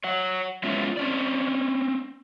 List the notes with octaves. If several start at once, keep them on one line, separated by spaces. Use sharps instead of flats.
C#5 F#5
G#3 B3 C#4 E4 F4
C4 C#4 D5